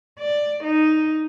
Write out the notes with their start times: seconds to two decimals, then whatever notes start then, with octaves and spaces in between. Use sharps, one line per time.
0.19 D5
0.64 D#4